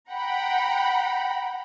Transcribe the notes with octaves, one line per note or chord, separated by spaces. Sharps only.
F#5 G5 A#5 B5